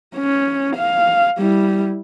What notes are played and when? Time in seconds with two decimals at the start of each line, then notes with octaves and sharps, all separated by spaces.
0.16 C#4
0.76 F5
1.38 G3 E4